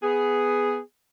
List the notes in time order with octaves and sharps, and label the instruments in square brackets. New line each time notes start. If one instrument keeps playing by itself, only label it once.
[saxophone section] B3 G#4